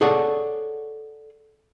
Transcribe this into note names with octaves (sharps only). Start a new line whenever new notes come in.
G#4 A4 C#5 D5 F#5